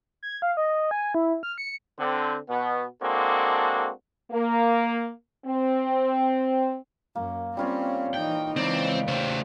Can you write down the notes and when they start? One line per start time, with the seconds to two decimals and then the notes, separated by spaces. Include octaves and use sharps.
0.23 G#6
0.42 F5
0.57 D#5
0.91 G#5
1.15 E4
1.43 F6
1.58 C#7
1.99 D3 C4
2.49 B2 B3
3.03 G#3 A#3 C4 D4 F#4 A4
4.31 A#3
5.46 C4
7.15 F#2 A#3
7.57 G3 C4 C#4 F4 C#5
8.14 E3 D#4 G5
8.56 C#2 E3 C4 D5
9.08 C#3 A3 G4 C5